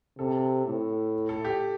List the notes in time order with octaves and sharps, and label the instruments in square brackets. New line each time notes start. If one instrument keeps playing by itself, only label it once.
[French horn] C3 [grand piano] A4
[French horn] A2
[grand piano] A4
G4